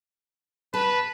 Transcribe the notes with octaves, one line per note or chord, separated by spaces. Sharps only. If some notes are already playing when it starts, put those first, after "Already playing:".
B4 A5